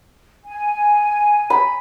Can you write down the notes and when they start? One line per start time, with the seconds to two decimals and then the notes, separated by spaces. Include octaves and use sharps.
0.46 G#5
1.50 B5